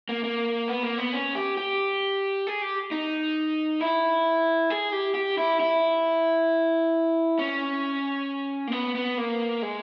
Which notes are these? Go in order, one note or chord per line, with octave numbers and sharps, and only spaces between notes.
A#3
A#3
B3
A#3
B3
C#4
G4
G4
G#4
G4
D#4
E4
G#4
G4
G4
E4
E4
C#4
A#3
B3
B3
A#3
G#3